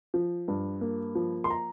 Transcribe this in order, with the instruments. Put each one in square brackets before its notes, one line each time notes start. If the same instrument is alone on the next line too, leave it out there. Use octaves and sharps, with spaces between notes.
[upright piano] F3
G2
A#3
F3
C6
A#5